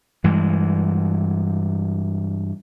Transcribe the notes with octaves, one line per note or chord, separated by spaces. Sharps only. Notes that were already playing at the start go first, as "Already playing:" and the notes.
G2 E3 G#3